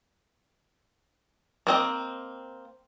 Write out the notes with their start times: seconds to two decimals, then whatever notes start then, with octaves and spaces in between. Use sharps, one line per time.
1.67 A#3 C4 D#5